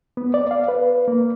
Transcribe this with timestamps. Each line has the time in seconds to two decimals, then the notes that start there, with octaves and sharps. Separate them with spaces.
0.17 B3
0.34 D5
0.51 F5
0.68 B4
1.08 A#3